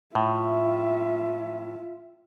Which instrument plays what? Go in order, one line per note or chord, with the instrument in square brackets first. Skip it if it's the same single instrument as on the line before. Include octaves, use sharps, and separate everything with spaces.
[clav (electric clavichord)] A2 [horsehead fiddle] F4 E5